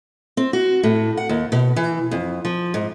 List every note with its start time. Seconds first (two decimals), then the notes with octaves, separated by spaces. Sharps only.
0.37 C4
0.53 F#4
0.83 A2
1.17 F#5
1.29 D#2
1.52 B2
1.76 E3
2.11 F2
2.45 F3
2.74 G#2